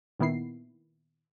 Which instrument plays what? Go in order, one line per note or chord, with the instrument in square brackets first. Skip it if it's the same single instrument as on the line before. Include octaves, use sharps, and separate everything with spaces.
[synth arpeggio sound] A#2 D#3 B3 E4 C7